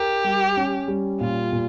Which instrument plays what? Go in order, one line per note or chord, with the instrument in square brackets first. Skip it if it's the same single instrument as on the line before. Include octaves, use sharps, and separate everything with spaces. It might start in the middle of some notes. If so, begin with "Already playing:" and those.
Already playing: [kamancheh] G4 [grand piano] A#4
[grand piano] G3
C#4
G3
[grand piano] A#2 [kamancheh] F4
[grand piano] A#2